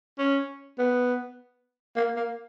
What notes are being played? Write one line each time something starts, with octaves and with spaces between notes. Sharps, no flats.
C#4
B3
A#3
A#3